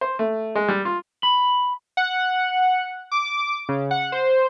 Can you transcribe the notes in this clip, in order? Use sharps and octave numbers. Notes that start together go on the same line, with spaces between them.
C5
A3
G#3
G3
F4
B5
F#5
D6
C#3
F#5
C5